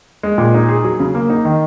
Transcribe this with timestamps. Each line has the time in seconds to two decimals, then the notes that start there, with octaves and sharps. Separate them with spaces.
0.23 G#3
0.38 A#2
0.54 D#4
0.69 G#4
0.84 F#3
1.00 C#3
1.15 A#3
1.30 D#4
1.45 D#3